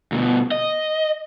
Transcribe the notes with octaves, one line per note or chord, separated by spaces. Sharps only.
D2 B2
D#5